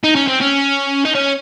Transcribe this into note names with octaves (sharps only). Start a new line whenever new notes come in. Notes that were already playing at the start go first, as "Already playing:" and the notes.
D#4
C#4
C4
C#4
D#4
C#4